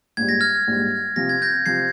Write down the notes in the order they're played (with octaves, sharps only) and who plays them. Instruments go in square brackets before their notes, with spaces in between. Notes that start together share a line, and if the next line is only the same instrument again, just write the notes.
[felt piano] A#1 G#2 G3 [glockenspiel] G#6
[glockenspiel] A#6
F6 G#6
[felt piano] A#1 G#2 G3
[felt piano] C3 F3 C4 G4 [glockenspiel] A#6
[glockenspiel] G#6
G6 A#6
[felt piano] C3 F3 C4 G4 [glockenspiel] G#6 C7